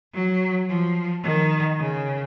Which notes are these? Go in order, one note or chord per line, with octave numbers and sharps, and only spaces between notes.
F#3
F3
D#3
C#3